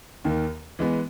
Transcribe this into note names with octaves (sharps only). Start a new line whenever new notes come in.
D#2 D#3 A#3
E3 G#3 B3